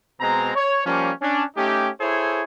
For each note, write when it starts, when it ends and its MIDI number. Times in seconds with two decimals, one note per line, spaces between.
0.20 0.51 47
0.20 0.51 56
0.20 0.51 60
0.20 0.51 82
0.56 0.83 73
0.86 1.12 53
0.86 1.12 55
0.86 1.12 58
0.86 1.12 61
1.22 1.43 61
1.22 1.43 62
1.57 1.89 57
1.57 1.89 61
1.57 1.89 63
1.57 1.89 67
2.00 2.43 64
2.00 2.43 68
2.00 2.43 69
2.00 2.43 72
2.00 2.43 73